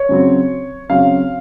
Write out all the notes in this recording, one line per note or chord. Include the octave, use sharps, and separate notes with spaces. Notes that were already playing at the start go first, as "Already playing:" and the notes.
Already playing: C#5
C#3 F#3 C4
C#3 F#3 C4 F5